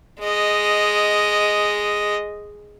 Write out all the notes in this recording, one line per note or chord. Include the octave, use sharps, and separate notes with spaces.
G#3 D#5